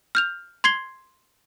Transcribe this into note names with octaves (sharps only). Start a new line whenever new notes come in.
F6 G6 F7
C6 G#6 C7 G7